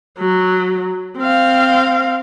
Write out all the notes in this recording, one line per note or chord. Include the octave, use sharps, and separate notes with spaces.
F#3
C4 F5